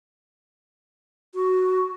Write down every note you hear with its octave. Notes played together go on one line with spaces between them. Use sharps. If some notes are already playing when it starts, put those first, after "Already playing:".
F#4